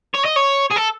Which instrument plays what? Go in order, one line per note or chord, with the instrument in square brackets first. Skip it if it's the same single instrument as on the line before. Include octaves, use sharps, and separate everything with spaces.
[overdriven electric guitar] C#5
D#5
C#5
G#4
A4